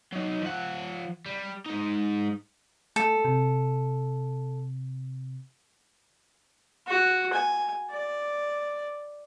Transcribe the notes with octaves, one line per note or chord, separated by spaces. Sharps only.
F#3 D#4
F3 F#5
G3
G#3 D#4
A3 A4
C3
F#4
G#5
D5